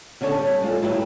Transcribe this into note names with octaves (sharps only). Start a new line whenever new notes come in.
D3 C#4 D4 A4 C#5
G3
G#3 F4 A4
F#3 E4 G4 A4 B4